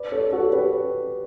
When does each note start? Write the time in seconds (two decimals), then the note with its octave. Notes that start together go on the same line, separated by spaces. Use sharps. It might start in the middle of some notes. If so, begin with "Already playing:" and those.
Already playing: B4 D5
0.12 A4 C#5
0.32 F#4 A4
0.53 G4 B4